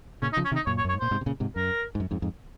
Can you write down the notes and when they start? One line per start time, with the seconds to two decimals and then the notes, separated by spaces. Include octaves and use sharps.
0.22 A#2 C#3 C#4
0.33 D#4
0.37 C#3 F3
0.45 C#4
0.52 C3 D#3
0.56 D#4
0.66 F#2 A#2 C#5
0.78 C#5
0.84 F#2
0.89 C#5
0.94 G#2
1.00 A#2 C5
1.11 G#2 C3
1.21 C3
1.26 A#2 C#3
1.40 G#2 C3
1.56 F#2 A#4
1.95 G#2
2.00 F#2
2.11 F2 G#2
2.22 F2 G#2